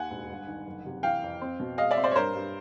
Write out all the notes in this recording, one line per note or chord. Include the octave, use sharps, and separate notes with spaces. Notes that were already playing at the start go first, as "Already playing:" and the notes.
Already playing: D#2 F#5 G#5
E1
G1
D#3
F#1
C3
E3 F5 G5
F2
C4
B2
G#3 D#5 F5
D5 E5
C4
C5 D5
C#5
G2 A#4 C5
G2